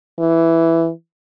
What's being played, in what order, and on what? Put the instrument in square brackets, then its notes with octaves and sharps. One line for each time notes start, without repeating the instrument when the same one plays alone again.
[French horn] E3